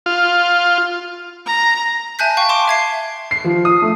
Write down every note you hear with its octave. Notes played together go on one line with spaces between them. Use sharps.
F4
A#5
E5 G#5 A5 F#6 G6 B6
F5 G5 C#6
A5 C6 D6 D7
E5 G#6 C7
C7
F3
D#6
A3